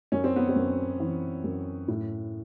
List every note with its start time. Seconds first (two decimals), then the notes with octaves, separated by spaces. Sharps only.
0.12 F#2 C#4
0.24 C4
0.36 B3
0.49 C4
0.56 F#2
1.00 E3
1.44 F#2
1.88 A2